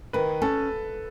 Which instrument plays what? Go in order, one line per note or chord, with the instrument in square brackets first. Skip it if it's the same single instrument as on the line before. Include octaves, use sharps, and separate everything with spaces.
[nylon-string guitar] D#3 [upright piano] B4
[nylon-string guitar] C#4 [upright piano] A4